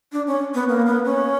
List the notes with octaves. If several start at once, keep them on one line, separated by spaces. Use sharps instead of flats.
D4
C#4
B3
A#3
B3
C#4